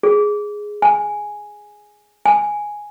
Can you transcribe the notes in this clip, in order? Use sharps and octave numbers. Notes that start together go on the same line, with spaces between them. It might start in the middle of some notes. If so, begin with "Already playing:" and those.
G#4
G#5
G#5